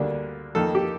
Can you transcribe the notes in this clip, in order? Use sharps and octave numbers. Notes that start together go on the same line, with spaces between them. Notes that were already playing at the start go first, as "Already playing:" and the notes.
Already playing: D2 D3 G3 A#3 D4
F2 D#3 A#3 D#4 A4
G4